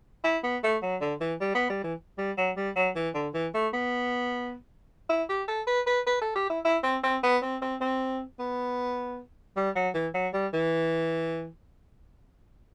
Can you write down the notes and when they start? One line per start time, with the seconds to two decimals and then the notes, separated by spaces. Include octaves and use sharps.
0.24 E4
0.44 B3
0.63 A3
0.83 F#3
1.01 D3
1.21 E3
1.41 G3
1.55 B3
1.69 G3
1.84 E3
2.18 G3
2.38 F#3
2.57 G3
2.76 F#3
2.95 E3
3.15 D3
3.34 E3
3.54 A3
3.73 B3
5.10 E4
5.29 G4
5.48 A4
5.67 B4
5.87 B4
6.07 B4
6.21 A4
6.36 G4
6.50 E4
6.65 E4
6.84 C4
7.04 C4
7.24 B3
7.42 C4
7.62 C4
7.81 C4
8.39 B3
9.56 G3
9.76 F#3
9.94 E3
10.14 F#3
10.34 G3
10.53 E3